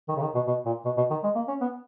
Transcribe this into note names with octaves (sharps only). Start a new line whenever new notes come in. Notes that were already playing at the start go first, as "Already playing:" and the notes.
D#3
C#3
D#3
B2
B2
A#2
B2
B2
D#3
G#3
A#3
C#4
B3